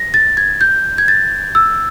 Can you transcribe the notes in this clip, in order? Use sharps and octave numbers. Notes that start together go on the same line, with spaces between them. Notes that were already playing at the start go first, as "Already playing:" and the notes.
Already playing: A#6
A6
G#6
G6
G#6
A6
E6